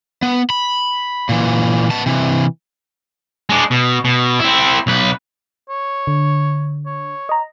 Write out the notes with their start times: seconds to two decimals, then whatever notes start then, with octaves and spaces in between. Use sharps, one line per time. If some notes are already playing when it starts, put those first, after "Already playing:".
0.22 B3
0.50 B5
1.29 A#2 E3
1.90 B3 A5
2.06 C3 E3
3.50 G#3 D4
3.71 B2
4.05 B2
4.40 C4 E4
4.87 B1 B4
5.69 C#5
6.07 D3
6.86 C#5
7.29 D#5 A#5